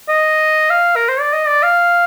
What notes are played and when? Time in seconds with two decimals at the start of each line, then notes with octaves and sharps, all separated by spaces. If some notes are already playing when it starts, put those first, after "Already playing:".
0.08 D#5
0.70 F5
0.96 A#4
1.09 C5
1.20 D5
1.33 D#5
1.47 D5
1.63 F5